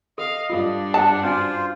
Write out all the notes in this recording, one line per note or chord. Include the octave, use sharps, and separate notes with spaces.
A4 D#5 F5
G2 D4 F4 A4 F5
F#5 A5
C#4 F4 F#4 C5 G#5